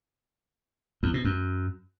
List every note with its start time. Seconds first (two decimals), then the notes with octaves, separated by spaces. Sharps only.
1.03 E2
1.14 B2
1.25 F#2